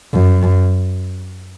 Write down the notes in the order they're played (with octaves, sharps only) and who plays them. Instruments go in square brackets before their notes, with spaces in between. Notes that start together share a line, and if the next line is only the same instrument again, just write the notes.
[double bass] F#2